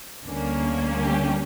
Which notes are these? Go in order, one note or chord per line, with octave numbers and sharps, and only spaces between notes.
D2 D3 G3 A#3 C#4
G4